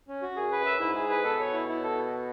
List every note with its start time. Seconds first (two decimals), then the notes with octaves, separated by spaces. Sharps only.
0.08 C#4
0.22 F#4
0.36 F#2 G#4
0.52 B4
0.61 F#2 E5
0.80 G#2 E4
0.95 G#4
1.10 B4
1.24 B2 A4
1.40 C#5
1.53 E4
1.69 E4
1.83 A4